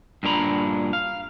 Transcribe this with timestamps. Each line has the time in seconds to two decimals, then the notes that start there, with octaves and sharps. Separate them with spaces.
0.23 G2 A#2 D4 G#4 A#5 B5
0.93 F5